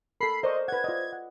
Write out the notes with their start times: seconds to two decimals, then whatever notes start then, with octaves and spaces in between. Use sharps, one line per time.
0.21 A4 A#4 B5 C7
0.43 A#4 C5 D5 D#5 C#6
0.68 B4 F#5 G#6
0.84 F4 D5 D#5
1.13 F#5